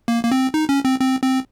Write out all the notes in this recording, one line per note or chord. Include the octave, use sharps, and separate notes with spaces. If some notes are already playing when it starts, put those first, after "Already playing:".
A#3
A#3
C4
D#4
C#4
C4
C4
C4